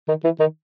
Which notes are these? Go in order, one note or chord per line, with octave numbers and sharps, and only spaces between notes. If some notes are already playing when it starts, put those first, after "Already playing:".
D#3
E3
D#3